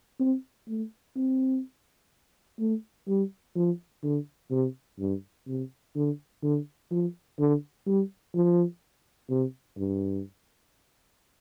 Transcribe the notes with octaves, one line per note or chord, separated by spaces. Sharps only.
C4
A3
C4
A3
G3
F3
D3
C3
G2
C3
D3
D3
F3
D3
G3
F3
C3
G2